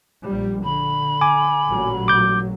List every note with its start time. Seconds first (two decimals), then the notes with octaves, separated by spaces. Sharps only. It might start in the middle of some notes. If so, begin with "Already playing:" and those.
0.24 A#1 G3
0.64 D3 B5
1.21 G#5 D6
1.68 A1 A#2 F#3
2.08 D6 G6